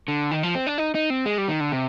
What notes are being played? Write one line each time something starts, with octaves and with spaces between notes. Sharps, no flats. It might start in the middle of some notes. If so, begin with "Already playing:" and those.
D3
D#3
F3
C4
D4
D#4
D#4
C4
G#3
G3
D#3
D3
C3